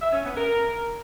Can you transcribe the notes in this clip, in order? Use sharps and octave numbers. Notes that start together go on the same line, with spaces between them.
E5
C#4
B3
A#4